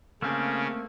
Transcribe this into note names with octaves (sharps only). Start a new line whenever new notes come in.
C#3 A3 A#3 C4 C#4